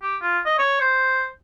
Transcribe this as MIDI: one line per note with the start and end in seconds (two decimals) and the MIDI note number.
0.02 0.17 67
0.22 0.39 65
0.46 0.54 75
0.59 0.80 73
0.81 1.27 72